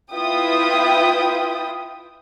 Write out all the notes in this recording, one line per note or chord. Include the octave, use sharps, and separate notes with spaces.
E4 F4 B4 E5 G5 D#6